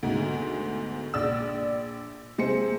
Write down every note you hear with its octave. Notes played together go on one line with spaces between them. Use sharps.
D2 G#2 B2
A#1 D5 E6
C3 G#3 C5 C#7